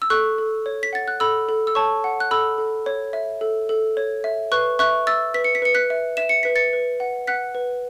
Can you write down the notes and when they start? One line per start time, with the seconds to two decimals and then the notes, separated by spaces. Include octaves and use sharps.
0.02 E6
0.10 A4 C#6 F#6
0.38 A4
0.66 C#5
0.83 B6
0.93 F#5 A6
1.08 F#6
1.20 A4 B5 E6
1.49 A4
1.67 E6
1.75 C#5 A5 C#6
2.04 F#5
2.20 F#6
2.31 A4 B5 E6
2.58 A4
2.86 C#5
3.13 E5
3.41 A4
3.69 A4
3.97 C#5
4.24 E5
4.52 B4 C#6 F#6
4.79 E5 C#6 F#6
5.07 E5 E6 A6
5.34 B4 B6
5.44 C#7
5.55 B6
5.62 B4 C#7
5.75 F#6 B6
5.90 E5
6.17 E5 E7
6.29 C#7
6.43 B4 B6
6.56 A6 C#7
6.73 B4
7.00 F#5
7.27 F#5 F#6 B6
7.55 B4